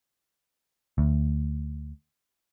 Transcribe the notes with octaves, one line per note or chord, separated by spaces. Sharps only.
D2